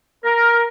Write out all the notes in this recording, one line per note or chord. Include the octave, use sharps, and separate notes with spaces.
A#4